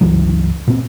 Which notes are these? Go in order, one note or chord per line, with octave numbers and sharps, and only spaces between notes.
G1 C#2 E3 F#3
A#2 C4